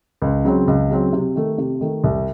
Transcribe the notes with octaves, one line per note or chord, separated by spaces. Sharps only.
C#2
C#3 F#3 C4
C#2
C#3 F#3 C4
C3
D#3 A3
C3
D#3 A3
C2